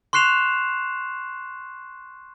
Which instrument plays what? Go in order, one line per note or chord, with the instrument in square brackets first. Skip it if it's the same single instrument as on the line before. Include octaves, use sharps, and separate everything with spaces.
[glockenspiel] C6 C#6 F#6 C7 E7 F7